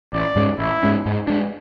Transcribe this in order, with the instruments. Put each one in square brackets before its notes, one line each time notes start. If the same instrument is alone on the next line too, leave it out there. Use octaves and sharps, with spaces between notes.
[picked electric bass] A1 [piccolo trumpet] D5
[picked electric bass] G#2 G#3 C#4
[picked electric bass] A1 [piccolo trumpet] E4
[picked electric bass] G#2 G#3 C#4
G#2
G#3 D4